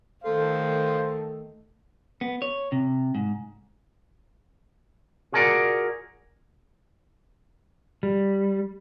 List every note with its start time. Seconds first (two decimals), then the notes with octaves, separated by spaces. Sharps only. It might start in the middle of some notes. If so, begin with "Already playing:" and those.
0.24 D#3 A3 A4 C5 F5
2.21 B3
2.42 C#5
2.72 C3
3.15 G#2
5.32 F4 F#4 G#4 A#4 D5 F#5
8.03 G3